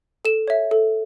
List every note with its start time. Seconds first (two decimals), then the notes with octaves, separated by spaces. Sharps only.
0.25 A4 E7
0.48 C#5 E5
0.71 A4